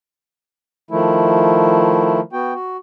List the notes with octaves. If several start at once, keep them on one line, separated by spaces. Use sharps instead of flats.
D#3 F3 A3 E4
B3 F#4 G5
F#4